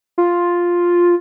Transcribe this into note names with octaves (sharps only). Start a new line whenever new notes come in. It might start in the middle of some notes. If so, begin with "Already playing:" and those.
F4